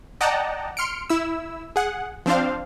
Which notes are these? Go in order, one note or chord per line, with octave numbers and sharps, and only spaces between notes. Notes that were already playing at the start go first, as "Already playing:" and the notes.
D5 D#5 F#5 G5 A5 A#5
C6 F6 C#7 D7
E4 E6
G#4 F#5
F3 C4 D4 C5 F5